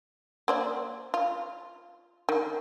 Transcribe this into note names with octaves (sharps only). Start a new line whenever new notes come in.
A#3 C5 D5
F4
D#3